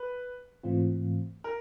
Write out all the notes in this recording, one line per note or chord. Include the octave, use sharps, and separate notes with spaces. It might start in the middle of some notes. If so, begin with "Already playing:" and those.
Already playing: B4
G#2 E3 A3 C4 F4
A#4